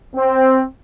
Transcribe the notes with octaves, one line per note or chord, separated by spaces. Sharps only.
C4